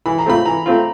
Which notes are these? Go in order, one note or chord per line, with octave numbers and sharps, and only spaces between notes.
E3 B5
A#5
A3 C4 F4 B5
E3 A#5
A3 C4 F4